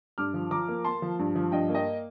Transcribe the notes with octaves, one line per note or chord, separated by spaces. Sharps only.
G2 D6 F6
F3
F3 A#5 D6
A#3
A#3 A5 C6
F3
G2
F3
G2 D#5 G5
A#3
D#5 G5